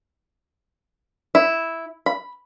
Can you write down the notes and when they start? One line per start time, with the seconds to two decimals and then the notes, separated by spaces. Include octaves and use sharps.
1.35 E4
2.06 B5